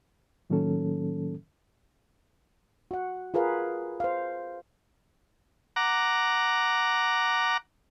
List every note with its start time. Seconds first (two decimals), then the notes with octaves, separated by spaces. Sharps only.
0.50 A2 D#3 F#3 A#3 C#4 A4
2.91 F#4 F#5
3.34 F4 G#4 A#4 B4 F5
4.00 C5 F5
5.76 F#5 A#5 D6